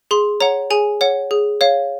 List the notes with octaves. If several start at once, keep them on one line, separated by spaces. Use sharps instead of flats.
G#4 C6
C#5 F#5 A#5
G#4 G#5
C#5 F#5
G#4
C#5 F5